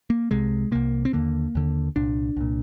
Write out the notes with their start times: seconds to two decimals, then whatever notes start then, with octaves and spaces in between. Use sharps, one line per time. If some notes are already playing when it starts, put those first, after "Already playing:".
0.10 A#3
0.31 C2 C3 G#3
0.71 C2 C3 A#3
1.05 C4
1.13 D#2 D3 A#3
1.55 D#2 D3
1.96 C2 A#2 D4
2.37 C2 A#2